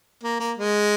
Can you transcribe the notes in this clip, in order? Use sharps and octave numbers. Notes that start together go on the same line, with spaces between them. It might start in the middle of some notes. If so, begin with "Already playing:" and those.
A#3
A#3
G#3